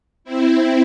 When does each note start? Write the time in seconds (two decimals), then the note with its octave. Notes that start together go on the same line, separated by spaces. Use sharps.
0.24 C4 E4